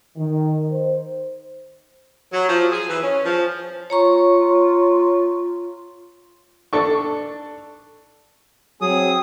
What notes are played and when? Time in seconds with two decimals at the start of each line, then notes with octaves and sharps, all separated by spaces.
0.16 D#3
0.71 C5
2.33 F#3
2.48 F3
2.71 G#4
2.88 E3
3.02 C#4
3.24 F3
3.90 F4 C#5 A#5 C#6
6.73 D4 A4 C#6
8.81 F#3 C4 G#4 D#6